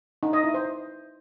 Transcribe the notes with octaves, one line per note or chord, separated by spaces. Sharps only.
D#4
D#5
E4
C5